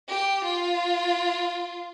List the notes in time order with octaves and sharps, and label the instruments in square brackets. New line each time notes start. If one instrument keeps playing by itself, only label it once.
[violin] G4
F4